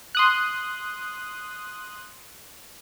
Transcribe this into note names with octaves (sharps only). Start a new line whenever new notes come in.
C6 D#6 F#6